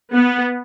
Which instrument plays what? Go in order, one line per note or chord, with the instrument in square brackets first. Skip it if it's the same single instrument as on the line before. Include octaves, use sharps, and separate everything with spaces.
[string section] B3